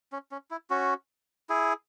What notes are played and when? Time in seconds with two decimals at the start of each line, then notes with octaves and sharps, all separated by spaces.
0.12 C#4
0.31 C#4
0.51 E4
0.70 C#4 F#4
1.49 E4 G#4